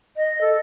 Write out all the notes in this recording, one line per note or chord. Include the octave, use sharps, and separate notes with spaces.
D#5
A4